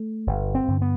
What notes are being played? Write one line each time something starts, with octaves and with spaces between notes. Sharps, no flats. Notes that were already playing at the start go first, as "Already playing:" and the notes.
Already playing: A3
G1
C4
G2 D3
B3